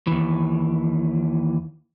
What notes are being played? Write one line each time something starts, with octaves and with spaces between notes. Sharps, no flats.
D#2 E3